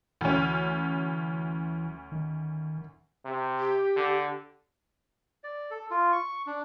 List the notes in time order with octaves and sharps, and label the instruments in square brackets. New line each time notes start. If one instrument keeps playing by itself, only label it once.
[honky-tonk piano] D2 C#4 [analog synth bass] E3
[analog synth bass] D#3
[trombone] C3
[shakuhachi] G4
[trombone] D3
[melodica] D5
A4
F4
C#6
D4